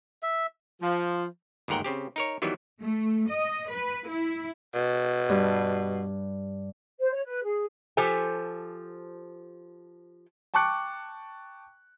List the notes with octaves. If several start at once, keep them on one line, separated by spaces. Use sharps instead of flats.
E5
F3
G1 D#2 G#2 A#4 F#5 G5
C#3 C4 G4
D#4 A#4 C#5
D#3 E3 F#3 G3 B3
A3
D#5
B4
E4
B2
G2
C5
C#5
B4
G#4
F3 G4 A4 C5 G#5
G5 A5 C#6 D6 F#6 C#7